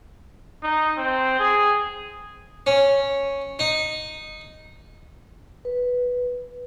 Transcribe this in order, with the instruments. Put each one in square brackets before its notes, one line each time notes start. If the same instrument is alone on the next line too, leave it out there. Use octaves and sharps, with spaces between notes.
[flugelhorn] D#4
C4
G#4
[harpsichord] C#4
D#4
[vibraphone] B4